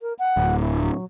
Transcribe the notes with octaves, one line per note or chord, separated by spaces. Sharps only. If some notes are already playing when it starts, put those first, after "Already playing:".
A#4
F#5
D1
E4
F#3